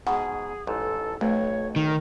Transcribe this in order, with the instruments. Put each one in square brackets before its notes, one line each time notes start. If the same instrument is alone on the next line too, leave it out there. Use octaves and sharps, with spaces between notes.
[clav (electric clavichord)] G#2 B2 [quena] G#4 [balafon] F#5
[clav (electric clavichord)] A1 G#2 [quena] A4
[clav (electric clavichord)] B1 F2 [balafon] A3 [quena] C#5
[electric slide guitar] D#3 [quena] A#4